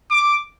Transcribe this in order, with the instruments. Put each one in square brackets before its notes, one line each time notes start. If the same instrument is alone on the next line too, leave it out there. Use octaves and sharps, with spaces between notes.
[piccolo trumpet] D6